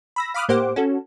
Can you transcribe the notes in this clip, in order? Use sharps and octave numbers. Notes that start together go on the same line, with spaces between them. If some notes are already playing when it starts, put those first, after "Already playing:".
B5 E6 A#6
F5 B5 D6 D#6 F6 F#6
A2 A#3 G4 C5 F#5 D6
C#4 F#4 A4